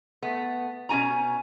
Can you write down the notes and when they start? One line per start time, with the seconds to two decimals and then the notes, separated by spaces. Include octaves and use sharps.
0.23 A3 B3
0.89 B2 C#4 F#4 G#5 A#5